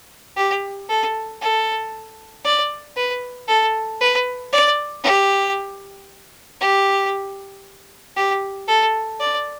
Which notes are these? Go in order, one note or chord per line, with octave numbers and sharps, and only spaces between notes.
G4
A4
A4
D5
B4
A4
B4
D5
G4
G4
G4
A4
D5